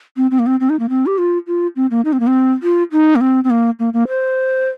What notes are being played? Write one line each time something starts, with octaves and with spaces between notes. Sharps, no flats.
C4
C4
A#3
C4
C4
D#4
A#3
C4
G4
F4
F4
C4
A#3
D#4
C4
A#3
C4
F4
D#4
A#3
C4
C4
A#3
A#3
A#3
C5